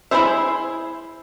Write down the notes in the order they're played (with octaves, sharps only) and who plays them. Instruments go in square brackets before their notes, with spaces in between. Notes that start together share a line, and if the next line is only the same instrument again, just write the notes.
[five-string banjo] E4 F4 G#4 C5 E5